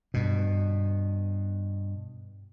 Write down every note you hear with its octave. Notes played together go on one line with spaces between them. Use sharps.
G2 B2